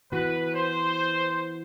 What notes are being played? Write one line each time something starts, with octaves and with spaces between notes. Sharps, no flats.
E3 B3 F#4 B4
C5